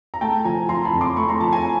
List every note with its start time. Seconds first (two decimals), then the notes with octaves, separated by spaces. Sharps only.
0.14 A#5
0.21 A3 G5 A5
0.44 F3 G#5 A#5
0.69 F3 A#5 C6
0.85 A5 B5
0.93 F2
1.01 C6 D6
1.16 A3 B5 C#6
1.28 A#5 C6
1.40 F3 A5 B5
1.53 G#5 A#5